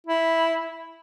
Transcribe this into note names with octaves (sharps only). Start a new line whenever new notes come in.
E4